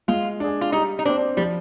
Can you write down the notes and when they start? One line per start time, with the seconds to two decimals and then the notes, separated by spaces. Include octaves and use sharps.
0.08 G#3 F4
0.40 D4 G#4
0.61 F4
0.72 G3 D#4
0.99 D#4
1.05 C4 D4 G4 C5
1.37 F3 G3